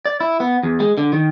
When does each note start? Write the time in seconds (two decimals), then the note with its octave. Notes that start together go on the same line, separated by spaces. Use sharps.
0.06 D5
0.21 E4
0.40 B3
0.63 E2
0.80 G#3
0.98 D3
1.13 D#3